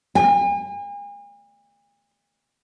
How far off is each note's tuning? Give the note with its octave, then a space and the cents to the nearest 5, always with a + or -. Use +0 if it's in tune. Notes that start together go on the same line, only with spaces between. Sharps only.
G#5 -40